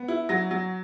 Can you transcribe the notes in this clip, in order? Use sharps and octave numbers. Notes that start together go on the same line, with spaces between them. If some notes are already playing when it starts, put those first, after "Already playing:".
Already playing: B3
E4
F#3 A#6
F#3